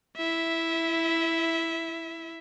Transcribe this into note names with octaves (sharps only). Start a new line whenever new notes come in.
E4 E5